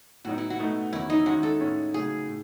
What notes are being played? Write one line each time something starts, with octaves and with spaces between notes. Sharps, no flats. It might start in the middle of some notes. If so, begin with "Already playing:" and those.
A2 F#3 B3 D#4 F#4
E4
F#4
B2 A3 D#4
E2 D#3 F#3 C#4 E4
D#4
D#3 G#3 C#4 E4 F#4
A4
A2 G#3 C#4 E4
C#3 F#3 A3 G#4
A2